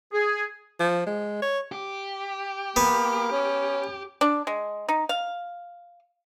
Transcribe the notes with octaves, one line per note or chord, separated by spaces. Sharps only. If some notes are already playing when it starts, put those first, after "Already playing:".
G#4
F3
G#3
C#5
G4
A#3 B3
C#4
D4
G#3
D#4
F5